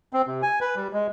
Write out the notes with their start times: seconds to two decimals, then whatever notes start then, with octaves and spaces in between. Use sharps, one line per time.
0.13 C4
0.27 C3
0.42 G#5
0.61 B4
0.76 G3
0.93 G#3